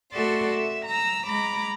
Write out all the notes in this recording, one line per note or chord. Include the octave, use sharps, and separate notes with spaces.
A3 F#4 A4 D5 E5 C6
E5
A#5 E6
G#3 A#5 B5 D6